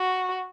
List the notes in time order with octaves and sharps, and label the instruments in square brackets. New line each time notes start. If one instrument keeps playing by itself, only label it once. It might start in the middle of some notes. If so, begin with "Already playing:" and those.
Already playing: [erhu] F#4